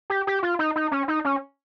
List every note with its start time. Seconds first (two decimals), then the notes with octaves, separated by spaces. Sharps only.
0.10 G4
0.27 G4
0.43 F4
0.59 D#4
0.76 D#4
0.91 C#4
1.08 D#4
1.25 C#4